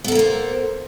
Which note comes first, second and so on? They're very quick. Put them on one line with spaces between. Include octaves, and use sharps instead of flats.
B3 A4 A#4 A#3 C5